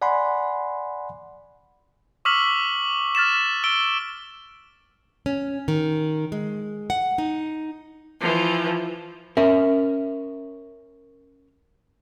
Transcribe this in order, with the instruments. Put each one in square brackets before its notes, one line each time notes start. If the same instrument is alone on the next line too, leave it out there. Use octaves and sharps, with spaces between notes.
[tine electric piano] D5 F#5 G#5 B5 C6
[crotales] C#6 D6 E6 F6 B6 F#7
F6 A6 B6 E7
E6 D7 G7
[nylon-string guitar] C#4
D#3
G#3
F#5
D#4
[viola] E3 F3
[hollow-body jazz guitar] C#4 A#4 E5